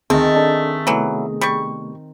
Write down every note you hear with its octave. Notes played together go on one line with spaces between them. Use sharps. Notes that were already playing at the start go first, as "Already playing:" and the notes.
D2 D#3 A3 C4 G#4
D4 A4
C3 E3 F#3 A3 B3
G3 C#6